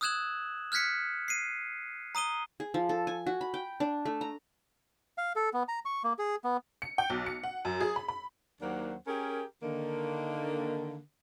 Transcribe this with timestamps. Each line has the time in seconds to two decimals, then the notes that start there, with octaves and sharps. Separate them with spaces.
0.01 D#6 E6 F#6 G#6 E7 F#7
0.72 F6 F#6 G#6 B6 C#7
1.28 C7 D#7
2.15 A#5 D#6 D#7 G7
2.60 G#4
2.74 F3
2.89 A4
3.07 G#5
3.26 F#4
3.41 B5
3.54 G5
3.80 D4
4.06 A3
4.21 A#5
5.18 F5
5.36 A4
5.53 B3
5.68 A#5
5.85 C#6
6.04 A#3
6.19 G#4
6.44 B3
6.82 C#7
6.98 G5
7.10 B1
7.26 C#7
7.43 F#5
7.65 F#2
7.80 G#4
7.96 B5
8.08 B5
8.61 D#2 F#3 A#3 D4 C5 F#5
9.07 C#4 G4 G#4 A#4
9.63 D3 D#3 A#3